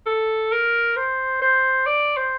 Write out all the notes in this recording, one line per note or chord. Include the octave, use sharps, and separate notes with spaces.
A4
A#4
C5
C5
D5
C5